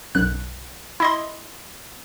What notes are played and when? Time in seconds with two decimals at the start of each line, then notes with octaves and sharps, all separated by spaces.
0.15 B1 F#2 F#6
1.00 E4 D#5 C6